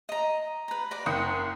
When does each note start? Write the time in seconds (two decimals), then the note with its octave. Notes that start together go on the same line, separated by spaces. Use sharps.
0.09 D#5 A#5
0.68 B4 A#5
0.91 B4 D5 A#5
1.06 F#1 F#5 G5 D#6 C#7